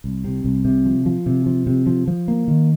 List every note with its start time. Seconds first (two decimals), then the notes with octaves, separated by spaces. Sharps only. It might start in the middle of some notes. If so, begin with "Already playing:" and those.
0.04 C2
0.24 C3
0.44 C2
0.65 C3
0.86 F3
1.06 F3
1.26 C3
1.46 F3
1.67 C3
1.86 F3
2.07 F3
2.28 A#3
2.48 D#3